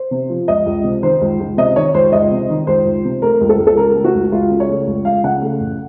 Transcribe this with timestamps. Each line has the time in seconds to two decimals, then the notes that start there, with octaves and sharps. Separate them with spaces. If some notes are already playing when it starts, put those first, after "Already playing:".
Already playing: C5
0.11 C3
0.30 F3
0.48 C#2 D#5
0.66 C#2
0.84 C3
1.02 D#3 C5
1.21 C#2
1.40 C#2
1.57 C3 D#5
1.76 D#3 C#5
1.94 C#2 C5
2.12 C#2 D#5
2.31 C3
2.50 D#3
2.67 C#2 C5
2.85 C#2
3.05 C3
3.22 A3 A#4
3.41 C#2
3.49 A4
3.59 C#2
3.67 A4
3.77 C#3 A#4
3.96 A3
4.04 F#4
4.14 C#2
4.32 C#2 F4
4.51 C#3
4.60 C#5
4.70 A3
4.87 C#2
5.05 C#2 F5
5.23 C#3 F#5
5.42 A3
5.60 A1